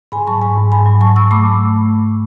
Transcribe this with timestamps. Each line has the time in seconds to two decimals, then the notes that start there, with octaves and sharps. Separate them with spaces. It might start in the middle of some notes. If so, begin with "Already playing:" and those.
0.12 G#2 G#5 B5
0.27 F#3 A5 C#6
0.42 G#2 G#5 B5
0.57 G#2
0.72 G#2 G#5 B5
0.86 F#3
1.01 F#3 A5 C#6
1.16 F#3 C#6 E6
1.31 A3 B5 D6